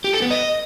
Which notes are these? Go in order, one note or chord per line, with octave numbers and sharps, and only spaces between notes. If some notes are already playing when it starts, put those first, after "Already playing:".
G4
A4
B3
D#5